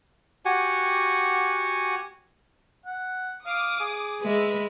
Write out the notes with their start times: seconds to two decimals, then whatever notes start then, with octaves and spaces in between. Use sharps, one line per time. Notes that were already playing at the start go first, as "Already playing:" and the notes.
0.45 F#4 G4 F#5 G#5
2.86 F#5
3.46 F5 D6 D#6
3.80 G#4
4.22 G#3 B4 E5